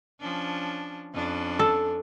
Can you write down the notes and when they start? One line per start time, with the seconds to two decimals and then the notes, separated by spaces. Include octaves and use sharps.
0.20 F3 C#4 D4
1.14 F2 C#4 D4
1.59 A4